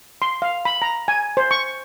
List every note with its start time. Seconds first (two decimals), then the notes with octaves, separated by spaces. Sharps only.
0.22 C6
0.42 F5
0.65 B5
0.82 A#5
1.08 G#5
1.37 C5
1.51 C#6